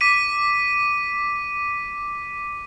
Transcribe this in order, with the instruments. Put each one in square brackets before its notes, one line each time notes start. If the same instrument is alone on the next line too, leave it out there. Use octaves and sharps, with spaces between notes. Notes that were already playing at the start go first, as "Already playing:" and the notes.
[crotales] D6 B6 D#7